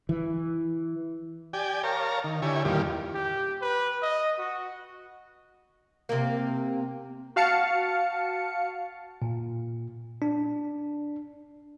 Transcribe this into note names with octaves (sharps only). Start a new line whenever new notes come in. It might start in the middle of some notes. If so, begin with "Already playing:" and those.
E3
G4 D5 G5 G#5
A#4 C#5 F5 A5 A#5
D#3
D3 E4 G4 C#5 G#5
E2 A#2 D#3 G3 F4 G4
G4
B4
D#5
F#4
C3 A#3
F#4 F5 A5 C#7
A#2
D4